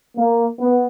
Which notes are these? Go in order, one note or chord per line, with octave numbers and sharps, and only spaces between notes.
A#3
B3